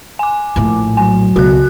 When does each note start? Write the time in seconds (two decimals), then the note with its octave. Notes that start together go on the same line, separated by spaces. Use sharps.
0.19 G#5 D6
0.56 A#1 A2
0.97 F#3 G#5
1.36 C#2 B2 F#4 F#6